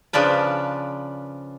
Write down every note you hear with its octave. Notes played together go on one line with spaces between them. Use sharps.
C#3 F3 D4 B4